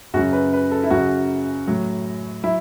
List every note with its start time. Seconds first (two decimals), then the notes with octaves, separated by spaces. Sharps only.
0.14 F#2 C#3 F#3 F#4
0.33 B4
0.53 B4
0.72 A4
0.84 E4
0.90 F#2 C#3 F#3 F#4
1.68 A2 F#3
2.43 F#3 E4